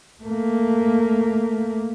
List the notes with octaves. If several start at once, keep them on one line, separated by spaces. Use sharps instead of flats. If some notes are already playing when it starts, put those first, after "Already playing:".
A3 A#3